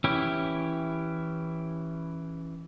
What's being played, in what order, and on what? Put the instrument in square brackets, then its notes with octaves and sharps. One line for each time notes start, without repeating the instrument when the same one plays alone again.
[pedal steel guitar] E3 C#4 E4 G4